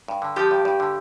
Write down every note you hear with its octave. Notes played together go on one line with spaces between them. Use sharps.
G2
D3
F3 G4
G2
G2
D3